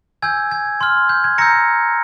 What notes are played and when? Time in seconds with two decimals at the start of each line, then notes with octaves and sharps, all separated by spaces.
0.22 G#5 E6 G6 G#6
0.51 G#6
0.81 C6 F6
1.09 G6
1.24 G#6
1.38 A#5 E6 G6 A#6 C#7